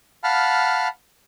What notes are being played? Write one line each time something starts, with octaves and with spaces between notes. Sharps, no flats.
F5 F#5 A5 B5 F6